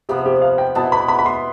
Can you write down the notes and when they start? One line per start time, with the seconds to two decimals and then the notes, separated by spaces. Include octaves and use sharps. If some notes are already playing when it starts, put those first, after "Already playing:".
0.09 C3 F3 B3 G4
0.26 G4
0.42 F5
0.58 G5
0.75 B2 B3 E4 A5
0.92 B5
1.08 B5
1.19 B5
1.26 C6